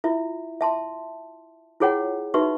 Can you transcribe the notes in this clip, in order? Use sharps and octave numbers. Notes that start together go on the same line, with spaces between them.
E4 F4 E5
E5 A5 C6
E4 F4 G#4 C#5 F#5 G5
D#4 F#4 B4 E5 C6 C#6